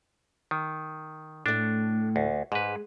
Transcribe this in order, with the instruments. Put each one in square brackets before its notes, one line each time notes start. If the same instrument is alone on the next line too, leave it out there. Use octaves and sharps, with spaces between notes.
[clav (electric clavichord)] D#3
[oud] A2 A3 [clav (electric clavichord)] D4
[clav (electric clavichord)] D2
[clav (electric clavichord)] G#2 B4 [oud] G#3